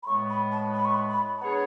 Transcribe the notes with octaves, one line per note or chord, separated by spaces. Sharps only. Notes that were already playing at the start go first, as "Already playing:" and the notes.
B5
A2 G#3 B3 C#6
B5
A5
B5
C#6
B5
B5
A5
B3 D4 G#4 C#5 B5